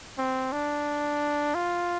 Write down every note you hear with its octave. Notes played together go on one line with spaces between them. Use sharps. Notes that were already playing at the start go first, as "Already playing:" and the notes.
C4
D4
F4